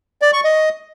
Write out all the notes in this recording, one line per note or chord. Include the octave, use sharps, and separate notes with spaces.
D5
C#6
D#5